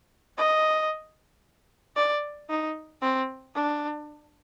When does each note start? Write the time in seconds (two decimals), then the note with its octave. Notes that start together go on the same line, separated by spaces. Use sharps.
0.38 D#5
1.96 D5
2.50 D#4
3.02 C4
3.55 D4